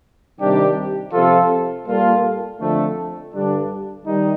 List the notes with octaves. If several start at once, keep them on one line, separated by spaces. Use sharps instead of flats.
C3 D#3 G3 D4 G4
C3 F3 C4 F4 A4
A#2 G3 A#3 F4 A4
F2 D3 F3 A3
G2 D3 G3 D4
D#3 G3 D#4